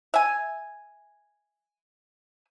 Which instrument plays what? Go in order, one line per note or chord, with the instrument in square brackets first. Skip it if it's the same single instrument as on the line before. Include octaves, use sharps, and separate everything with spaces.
[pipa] E5 G#5